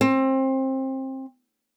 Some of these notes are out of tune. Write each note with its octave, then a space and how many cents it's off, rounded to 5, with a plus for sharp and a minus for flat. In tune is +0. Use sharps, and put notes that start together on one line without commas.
C4 +25